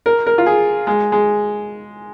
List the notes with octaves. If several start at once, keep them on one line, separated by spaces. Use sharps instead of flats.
A#4
A#4
F4
G#4
G#3
G#3